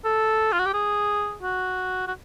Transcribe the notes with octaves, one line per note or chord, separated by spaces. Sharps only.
A4
F4
F#4
G4
G#4
F#4
F#4